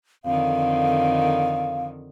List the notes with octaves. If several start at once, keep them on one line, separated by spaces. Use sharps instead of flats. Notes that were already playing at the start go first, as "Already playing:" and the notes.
F2 D3 D#3 F5